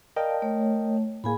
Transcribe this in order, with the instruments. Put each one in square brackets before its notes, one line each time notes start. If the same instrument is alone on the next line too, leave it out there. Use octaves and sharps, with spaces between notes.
[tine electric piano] A#4 D#5 G5 [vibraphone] D5 F5 A5
[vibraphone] A3 C#5
[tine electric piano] A2 A#3 [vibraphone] G#4 G#5 B5